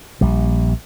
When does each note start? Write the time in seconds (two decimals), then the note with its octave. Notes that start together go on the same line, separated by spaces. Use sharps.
0.21 A#1 G3